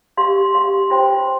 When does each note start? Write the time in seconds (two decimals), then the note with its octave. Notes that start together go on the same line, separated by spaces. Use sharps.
0.17 G4 F5 C6
0.54 G4 F5 C6
0.90 F4 C5 G5 C6